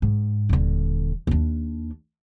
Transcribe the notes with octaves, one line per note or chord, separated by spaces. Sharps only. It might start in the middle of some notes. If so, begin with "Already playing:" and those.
G#2
D#1 D3
D#2 D4